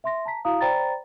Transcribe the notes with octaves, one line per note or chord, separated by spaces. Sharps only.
E5 C6 A#6
A5 A#5 B6
E4 F#4 F5 A#5 D#6
C5 D5 G5 A#5 B5 A6